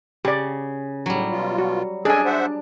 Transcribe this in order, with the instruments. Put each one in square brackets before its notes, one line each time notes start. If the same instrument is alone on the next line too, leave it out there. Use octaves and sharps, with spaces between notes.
[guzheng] C#3 [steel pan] G4 D5
[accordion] A2 [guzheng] F#3 G3
[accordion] B2 F4
[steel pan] F#4
[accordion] C#4 A4 D#5 [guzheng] D4 [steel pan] G#4 G#5
[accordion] C5 E5 F#5